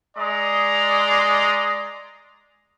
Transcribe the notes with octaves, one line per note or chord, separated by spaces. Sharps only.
G#3 D5 D#5 A#5 C6